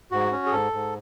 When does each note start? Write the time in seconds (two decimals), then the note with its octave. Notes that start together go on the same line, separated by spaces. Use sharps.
0.11 G#2 F#4
0.32 C#4
0.46 G#4
0.52 G#2 A4
0.72 G#2